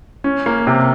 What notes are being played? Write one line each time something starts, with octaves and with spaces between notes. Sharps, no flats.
C#4
A#3
C3